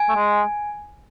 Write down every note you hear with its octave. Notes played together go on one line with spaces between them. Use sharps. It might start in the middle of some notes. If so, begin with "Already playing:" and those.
Already playing: G#5
A3
G#3